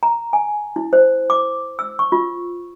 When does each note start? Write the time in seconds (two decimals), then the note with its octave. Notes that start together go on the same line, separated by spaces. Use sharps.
0.03 A#5
0.33 G#5
0.76 E4
0.93 C5
1.30 D6
1.79 E6
1.99 C#6
2.12 F4